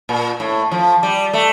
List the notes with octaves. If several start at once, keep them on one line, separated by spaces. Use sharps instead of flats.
A#2
A2
F3
G3
A3